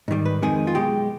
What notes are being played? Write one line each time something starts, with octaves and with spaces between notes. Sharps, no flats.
G#2 D#3 G3
B4
F2 C3 D#3 G#3 G#4
F4
B1 B2 G#3 G4